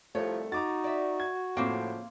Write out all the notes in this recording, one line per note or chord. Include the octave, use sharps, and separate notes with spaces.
C2 F3 A3 C#5
D#4 F#4 A#5 D6 A6
D5 E5
G#6
A2 C#3 F3 A#3 C4